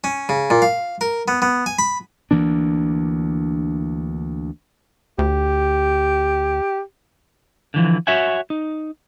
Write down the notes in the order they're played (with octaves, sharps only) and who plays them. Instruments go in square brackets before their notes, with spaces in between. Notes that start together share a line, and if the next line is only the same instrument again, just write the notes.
[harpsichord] C#4
C#3
A#2
F5
A#4
B3
B3
G#5
B5
[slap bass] D2 E3 A#3 D4
[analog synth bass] D2 [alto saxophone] G4
[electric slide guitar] D3 E3 F3
F#4 C#5 E5 F#5 G#5
D#4